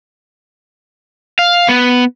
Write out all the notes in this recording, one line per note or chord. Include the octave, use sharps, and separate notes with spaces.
F5
B3